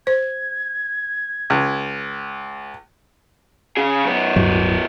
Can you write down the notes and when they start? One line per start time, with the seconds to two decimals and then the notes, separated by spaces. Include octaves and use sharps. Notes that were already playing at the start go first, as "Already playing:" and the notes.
0.07 C5 G#6
1.50 C#2
3.77 C#3 G#4
4.05 F#2 B3
4.36 D1 G2 F#3